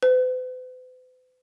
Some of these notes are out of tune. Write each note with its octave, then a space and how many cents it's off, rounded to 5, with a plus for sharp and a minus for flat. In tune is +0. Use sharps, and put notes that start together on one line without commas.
B4 +45